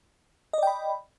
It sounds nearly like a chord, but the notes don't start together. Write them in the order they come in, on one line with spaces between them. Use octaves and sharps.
D#5 D5 G5 B5